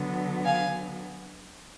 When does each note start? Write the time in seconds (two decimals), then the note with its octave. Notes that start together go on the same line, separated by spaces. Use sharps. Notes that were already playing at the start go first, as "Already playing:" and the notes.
Already playing: D3 F#3 B3
0.45 F5 G#5